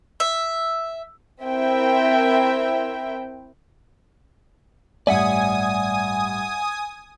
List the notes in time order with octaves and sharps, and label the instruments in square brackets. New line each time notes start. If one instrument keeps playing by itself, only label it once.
[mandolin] E5
[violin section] C4 E4 A#4 E5 G5
[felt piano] A1 G2 [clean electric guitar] D5 E5 F#5 [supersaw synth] G#5 D#6